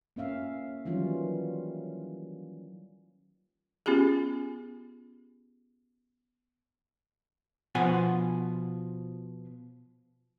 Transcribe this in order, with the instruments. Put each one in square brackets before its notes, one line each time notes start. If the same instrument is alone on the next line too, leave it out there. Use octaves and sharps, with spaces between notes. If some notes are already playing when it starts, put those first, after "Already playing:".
[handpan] A#3 C#4 E5 F5
D#3 E3 F#3 G3 C#4 F4
[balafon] B3 C#4 F4 G4 G#4
[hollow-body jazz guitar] B2 F3 B3 F#5 G#5 C6